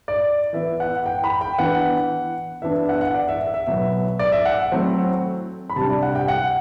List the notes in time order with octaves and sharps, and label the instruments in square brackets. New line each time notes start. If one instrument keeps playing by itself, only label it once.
[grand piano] D5
E3 B3 E4 E5
F#5
G5
B5
G5
E3 B3 D4 F#5
E3 B3 D4 E5
E5
F#5
F#5
D5
E5
E5
E5
B2 F#3 B3 E5
D5
E5
F#5
F#3 A3 C4 E4
B5
C3 G3 D4 A5
D5
F#5
G5
F#5